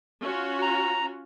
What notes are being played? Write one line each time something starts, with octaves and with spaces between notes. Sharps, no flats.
C#4 F4 F#4
A#5